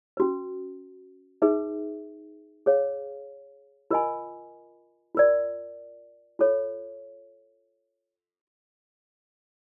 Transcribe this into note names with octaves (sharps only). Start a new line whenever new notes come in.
C#4 F#4 B4
D#4 G#4 B4 E5
G#4 C#5 F5
F4 A#4 D#5 G#5 B5
F4 A#4 D5
F4 A4 C#5